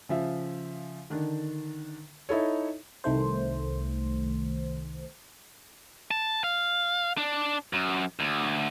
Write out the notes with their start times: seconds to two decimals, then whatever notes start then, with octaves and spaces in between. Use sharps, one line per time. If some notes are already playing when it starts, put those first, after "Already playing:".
0.09 C#3 F3 E5
1.10 D3 D#3 D4
2.29 D#4 E4 A4 C#5
3.04 C2 D#3 A3 C5
6.11 A5
6.44 F5
7.17 D4
7.73 F#2
8.19 D2